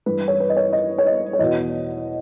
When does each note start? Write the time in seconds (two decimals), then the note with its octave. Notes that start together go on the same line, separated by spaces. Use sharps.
0.06 G2 E3 B4
0.28 C#5
0.40 B4
0.49 D#5
0.57 C#5
0.72 D#5
0.98 C#5
1.07 D#5
1.33 C#5
1.39 E2 B2 D#5